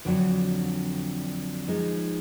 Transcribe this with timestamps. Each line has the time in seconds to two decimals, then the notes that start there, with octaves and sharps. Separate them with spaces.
0.05 F2 D3 F#3 D4 F#4
1.68 F3 G#3 D#4